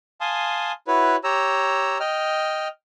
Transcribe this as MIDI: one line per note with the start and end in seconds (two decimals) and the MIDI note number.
0.21 0.72 77
0.21 0.72 80
0.21 0.72 81
0.21 0.72 84
0.21 0.72 87
0.87 1.16 64
0.87 1.16 66
0.87 1.16 71
0.87 1.16 73
1.24 1.98 67
1.24 1.98 73
1.24 1.98 82
1.24 1.98 88
2.00 2.68 75
2.00 2.68 79
2.00 2.68 89